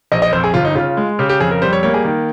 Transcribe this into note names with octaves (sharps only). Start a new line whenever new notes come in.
A#1 D#5
D#5
F2 C5
G#4
G1 F4
D#4
C#3 F4
G#3
C#3 G4
G4
F2 G#4
A#4
G3 C5
C#5
A#3 C#5
G#4
D#3